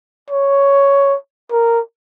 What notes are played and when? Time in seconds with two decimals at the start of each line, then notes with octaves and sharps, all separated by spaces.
0.30 C#5
1.51 A#4